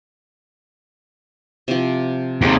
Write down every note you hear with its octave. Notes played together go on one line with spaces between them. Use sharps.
C3 F3
D#2 C3 C4 G#4 D5